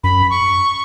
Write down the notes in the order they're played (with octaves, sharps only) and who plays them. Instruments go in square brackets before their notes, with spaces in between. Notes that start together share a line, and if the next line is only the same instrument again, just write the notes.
[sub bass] F#2 [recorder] B5
[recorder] C#6